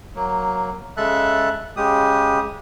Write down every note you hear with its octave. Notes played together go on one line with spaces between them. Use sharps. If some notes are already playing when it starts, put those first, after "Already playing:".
F#3 A#3
C#3 G#3 A4 E5 A5 F#6
C#3 G#3 G4 D#6